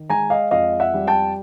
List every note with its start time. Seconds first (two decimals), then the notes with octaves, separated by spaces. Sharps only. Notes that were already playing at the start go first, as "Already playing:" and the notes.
Already playing: D#3
0.10 G#3 G#5 A#5
0.30 D#5 F5
0.51 F2 D#5 F5
0.80 E5 F#5
0.94 G3
1.07 G5 A5